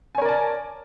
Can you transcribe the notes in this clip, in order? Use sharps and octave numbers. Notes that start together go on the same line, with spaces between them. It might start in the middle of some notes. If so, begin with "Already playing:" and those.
A#4 C#5 D5 G#5 A5